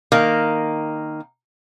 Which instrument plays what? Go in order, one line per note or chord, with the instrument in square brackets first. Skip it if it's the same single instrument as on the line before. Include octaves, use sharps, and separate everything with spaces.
[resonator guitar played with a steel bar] D#3 A#3